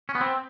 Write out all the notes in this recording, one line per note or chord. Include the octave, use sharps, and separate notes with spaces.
C#4
B3
C4